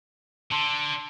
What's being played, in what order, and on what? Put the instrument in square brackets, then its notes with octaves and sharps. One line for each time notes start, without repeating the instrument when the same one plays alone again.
[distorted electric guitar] D3 [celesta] A5 C6 F#7